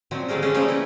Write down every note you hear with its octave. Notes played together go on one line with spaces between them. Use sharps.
A#2 D#3 F3 F#3 C4
D3 G3 A3 G#4 A#4
D#3 F3 G#3 C#4 D4
F3 G3 A3 A#3 C#4 D#4
E3 E4